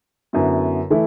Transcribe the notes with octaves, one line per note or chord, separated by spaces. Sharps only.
F#2 D3 B3 E4
E3 A3 E4